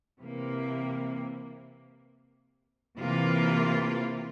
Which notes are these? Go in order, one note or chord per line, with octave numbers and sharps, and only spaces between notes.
C3 E3 A#3
C3 E3 A#3 F4